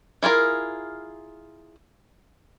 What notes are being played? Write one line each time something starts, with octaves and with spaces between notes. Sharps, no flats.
E4 F4 G#4 A#4